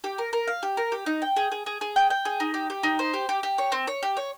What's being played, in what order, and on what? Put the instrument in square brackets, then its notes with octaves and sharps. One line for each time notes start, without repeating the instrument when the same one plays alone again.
[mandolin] G4
A#4
A#4
F5
G4
A#4
G4
D#4
G5
G#4
G#4
G#4
G#4
G5
G5
G#4
D#4
G4
G4
D#4
C5
G4
G4
G4
C#5
C4
C#5
G4
C#5